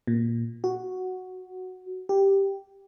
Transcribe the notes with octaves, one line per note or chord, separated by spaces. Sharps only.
A#2
F#4
G4